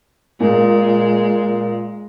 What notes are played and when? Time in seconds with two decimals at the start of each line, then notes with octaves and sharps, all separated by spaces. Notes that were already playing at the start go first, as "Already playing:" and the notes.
0.40 A#2 G#3